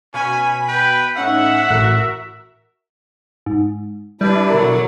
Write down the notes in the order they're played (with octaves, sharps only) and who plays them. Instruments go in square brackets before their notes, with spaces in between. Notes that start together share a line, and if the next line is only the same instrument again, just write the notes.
[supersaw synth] B2 B5 B6 [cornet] C#4 [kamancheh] G#5
[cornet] B4 [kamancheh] G5
[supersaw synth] A2 C#4 D#4 [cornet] E5 [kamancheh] F#5
[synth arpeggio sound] A1 A2 F#6 [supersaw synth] F#4 A#4
[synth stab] G#2
[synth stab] G3 [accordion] D4 E4 D5 [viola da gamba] B4
[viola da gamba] B2 D3 F#3 [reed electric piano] A#4